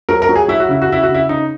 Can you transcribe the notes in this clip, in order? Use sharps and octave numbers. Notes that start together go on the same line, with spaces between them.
F#3 A#4
A#4
F#3
G#4
F#3 E4
F#4
C#3 E4
F#4
C#3 E4
F#4
C#3
E4
C#3 D#4